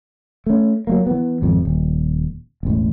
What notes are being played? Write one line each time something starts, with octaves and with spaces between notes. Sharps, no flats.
A3 C#4
F#3 A3 A#3
E3 B3
G#1 F2
D#1
E1 A1